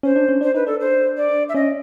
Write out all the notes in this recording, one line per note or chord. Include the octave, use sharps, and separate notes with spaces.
C#4 C5
D4
C#4
D4 C5
D#4 B4
D4 A4
C5
D5
E5
C#4 D#5